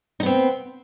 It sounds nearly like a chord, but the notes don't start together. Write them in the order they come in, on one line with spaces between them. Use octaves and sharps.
D#4 B3 C4